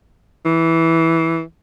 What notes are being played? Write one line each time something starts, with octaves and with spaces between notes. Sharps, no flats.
E3